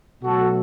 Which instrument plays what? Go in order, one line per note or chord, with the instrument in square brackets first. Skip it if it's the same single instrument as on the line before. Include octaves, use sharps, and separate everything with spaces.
[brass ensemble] B2 F#3 A3 F#4 A4